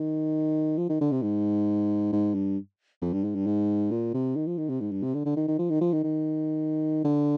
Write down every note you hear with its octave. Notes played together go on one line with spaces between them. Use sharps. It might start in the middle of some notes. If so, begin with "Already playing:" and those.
Already playing: D#3
F3
D#3
D3
C3
G#2
G#2
G2
F2
G2
G#2
G2
G#2
A#2
C3
D#3
F3
D#3
C3
G#2
G2
C3
D3
D3
D#3
D#3
F3
D#3
F3
D#3
D#3
D3